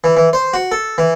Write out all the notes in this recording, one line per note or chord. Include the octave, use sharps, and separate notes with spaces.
E3
E3
C5
F#4
A4
E3